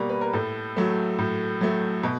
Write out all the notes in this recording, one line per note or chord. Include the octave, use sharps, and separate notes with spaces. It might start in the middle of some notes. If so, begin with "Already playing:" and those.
Already playing: B2 G3 A#3
B4
A#4
A2 A4
F#3 A3
A2
F#3 A3
B2